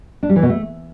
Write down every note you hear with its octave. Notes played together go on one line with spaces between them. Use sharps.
D4
G3
E3
B2
A3